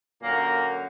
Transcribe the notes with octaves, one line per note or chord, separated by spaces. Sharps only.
F#2 A#2 D3 F#3 A#3